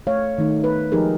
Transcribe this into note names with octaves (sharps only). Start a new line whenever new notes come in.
A3 C#5 F5
D#3 A3 D#4
B4
F3 G#3 D#4 G4 G#4 A#4